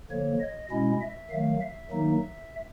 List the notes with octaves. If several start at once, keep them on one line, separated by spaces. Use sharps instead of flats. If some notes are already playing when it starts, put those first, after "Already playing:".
D3 F3 A#3 C#5
D#5
B2 G#3 C#4 E4 D#5
E5
D#3 F#3 A3 F5
E5
D#3 F#3 A#3 D#4